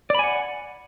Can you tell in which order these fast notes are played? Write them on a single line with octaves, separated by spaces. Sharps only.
D5 B5 G#5 F#5